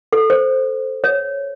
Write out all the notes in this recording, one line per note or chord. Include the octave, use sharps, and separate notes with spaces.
A4
C5
C#5